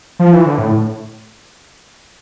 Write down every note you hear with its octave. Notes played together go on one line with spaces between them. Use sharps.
F3
E3
D3
A2